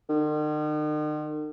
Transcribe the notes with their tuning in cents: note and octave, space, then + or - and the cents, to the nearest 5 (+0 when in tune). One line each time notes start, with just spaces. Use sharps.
D#3 -45